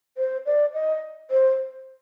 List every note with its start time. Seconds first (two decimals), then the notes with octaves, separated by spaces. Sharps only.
0.18 C5
0.46 D5
0.74 D#5
1.31 C5